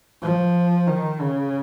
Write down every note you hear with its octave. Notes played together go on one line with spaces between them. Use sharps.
F3
D#3
C#3